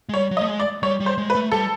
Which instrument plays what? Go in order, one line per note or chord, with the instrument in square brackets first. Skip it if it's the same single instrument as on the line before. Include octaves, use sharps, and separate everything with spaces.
[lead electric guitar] G#3
[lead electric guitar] G3 [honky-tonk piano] C#5
[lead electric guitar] F#3
[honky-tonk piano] D#5
[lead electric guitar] A3
G#3
[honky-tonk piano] D5
[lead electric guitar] G3 [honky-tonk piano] C#5
[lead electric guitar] G3
[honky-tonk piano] C5
[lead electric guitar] G#3
[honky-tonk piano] B4
[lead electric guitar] A3
[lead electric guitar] G3 [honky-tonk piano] A4